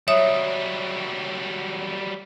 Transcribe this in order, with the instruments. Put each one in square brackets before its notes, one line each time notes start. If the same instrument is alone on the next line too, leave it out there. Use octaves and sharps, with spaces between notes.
[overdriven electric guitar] F#3 G3 [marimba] C#5 E5 D#6